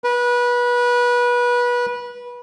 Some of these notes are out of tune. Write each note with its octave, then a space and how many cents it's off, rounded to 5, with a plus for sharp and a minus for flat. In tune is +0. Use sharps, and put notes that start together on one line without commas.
B4 -25